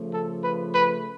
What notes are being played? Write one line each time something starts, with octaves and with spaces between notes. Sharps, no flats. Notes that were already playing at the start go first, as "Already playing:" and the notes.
Already playing: C#3 F3 A3
A4
B4
B4